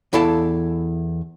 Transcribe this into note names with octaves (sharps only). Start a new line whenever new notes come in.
E2 E4 A4 F5 A5